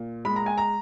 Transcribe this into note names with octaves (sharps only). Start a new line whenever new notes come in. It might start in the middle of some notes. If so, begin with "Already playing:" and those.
Already playing: A#2
G#3 B5
A#5
G#5
A#5